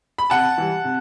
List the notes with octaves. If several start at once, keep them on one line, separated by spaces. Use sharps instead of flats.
B5
C3 F#5 A5
E3 G3
C3